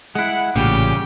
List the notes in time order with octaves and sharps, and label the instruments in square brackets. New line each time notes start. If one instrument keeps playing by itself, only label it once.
[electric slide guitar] G#3 E4 [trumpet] F#5
[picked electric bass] A1 [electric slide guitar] A#2 G3 [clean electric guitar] C#3 [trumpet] G4